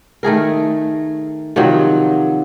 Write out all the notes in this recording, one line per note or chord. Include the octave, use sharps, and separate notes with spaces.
D#3 A3 G#4 A#4
C3 D#3 F3 F#3